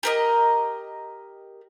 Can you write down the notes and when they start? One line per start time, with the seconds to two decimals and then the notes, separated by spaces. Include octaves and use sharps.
0.03 G4 A#4 D#5